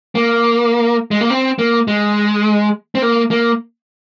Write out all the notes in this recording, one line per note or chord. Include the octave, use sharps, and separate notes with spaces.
A#3
G#3
A#3
C4
A#3
G#3
C4
A#3
A#3